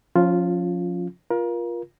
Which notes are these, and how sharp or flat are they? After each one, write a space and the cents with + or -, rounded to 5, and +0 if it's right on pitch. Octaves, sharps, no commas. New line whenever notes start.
F3 +30 C#4 +0 F4 +0
F4 +0 A#4 +30